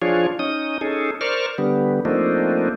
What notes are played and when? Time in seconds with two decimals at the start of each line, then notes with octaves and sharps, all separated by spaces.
0.02 F3 D4 F4 G#4 C#5
0.39 C#4 D#4 D#6
0.81 C#4 D#4 G#4 A4
1.21 A#4 C5 D5 C#6 F6
1.58 D3 G3 B3
2.05 F3 A3 A#3 C4 D4 D#4